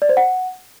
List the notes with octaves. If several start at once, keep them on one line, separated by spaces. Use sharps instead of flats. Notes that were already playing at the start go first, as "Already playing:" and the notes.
D5
C5
F#5